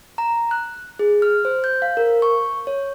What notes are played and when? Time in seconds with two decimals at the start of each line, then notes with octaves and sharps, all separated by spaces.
0.18 A#5
0.51 F#6
0.99 G#4
1.22 F6
1.45 C5
1.64 G6
1.82 F5
1.97 A#4
2.22 C#6
2.67 C#5